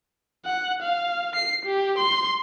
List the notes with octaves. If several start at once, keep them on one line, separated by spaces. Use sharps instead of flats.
F#5
F5
C7
G4
C6